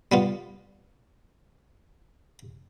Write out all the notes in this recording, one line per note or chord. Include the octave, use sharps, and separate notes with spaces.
G3 B3 F4